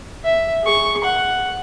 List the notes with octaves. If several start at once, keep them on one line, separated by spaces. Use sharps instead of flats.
E5
G#4 C#6
F#5